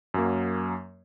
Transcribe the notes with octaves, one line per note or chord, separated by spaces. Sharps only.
F#2 F#3 A#3